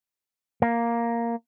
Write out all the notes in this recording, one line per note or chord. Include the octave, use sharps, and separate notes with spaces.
A#3